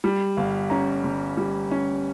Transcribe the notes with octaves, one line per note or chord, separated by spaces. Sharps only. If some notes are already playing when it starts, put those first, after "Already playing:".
G3
G1 F5
C#4 A#5
G1
G3
C#4